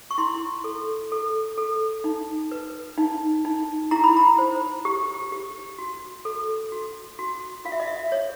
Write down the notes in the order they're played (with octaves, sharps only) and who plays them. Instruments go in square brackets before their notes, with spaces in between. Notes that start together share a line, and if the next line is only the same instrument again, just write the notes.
[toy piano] C#6
E4 C6
A4
A4
A4
D#4
B4
D#4
D#4
E4 A#5
B5
A#5
C5
G4
G4
F#4
A4
F#4
F#4
F4 F5
E5
D#5
E5
C#5